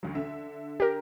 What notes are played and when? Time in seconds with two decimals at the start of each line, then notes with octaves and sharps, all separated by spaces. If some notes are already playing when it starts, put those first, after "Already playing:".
0.03 D2 F#3
0.15 D3 E5
0.80 G4 A#4